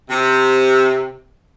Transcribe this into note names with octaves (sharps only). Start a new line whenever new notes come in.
C3